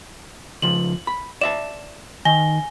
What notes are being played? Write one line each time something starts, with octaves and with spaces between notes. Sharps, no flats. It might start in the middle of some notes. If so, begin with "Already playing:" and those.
C#3 F3 F#7
B5
D5 E5 A5 E7
D#3 G#5 A#6 G7